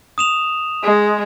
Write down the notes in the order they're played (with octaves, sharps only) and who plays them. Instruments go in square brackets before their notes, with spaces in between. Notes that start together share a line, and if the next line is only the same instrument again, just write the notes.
[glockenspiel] D#6 E7 F7
[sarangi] G#3